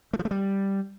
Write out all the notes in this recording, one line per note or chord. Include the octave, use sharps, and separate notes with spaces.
A3
F3
A3
G3